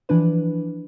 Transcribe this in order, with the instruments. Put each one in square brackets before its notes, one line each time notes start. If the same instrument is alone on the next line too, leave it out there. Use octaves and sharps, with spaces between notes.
[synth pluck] E3 F3 D4 B4